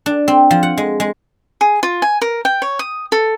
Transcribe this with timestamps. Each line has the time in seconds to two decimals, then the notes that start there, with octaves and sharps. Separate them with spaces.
0.06 D4
0.28 C4
0.51 F3
0.63 F#5
0.77 G#3
1.00 G#3
1.61 G#4
1.83 F4
2.02 G#5
2.22 A#4
2.45 G5
2.62 C#5
2.79 D#6
3.12 A4